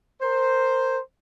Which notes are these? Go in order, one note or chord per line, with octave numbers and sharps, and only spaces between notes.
A#4 C5